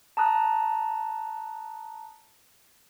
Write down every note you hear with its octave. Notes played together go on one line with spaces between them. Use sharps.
A5 A#5 D#6 F#6